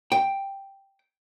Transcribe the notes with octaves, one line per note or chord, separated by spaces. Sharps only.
G5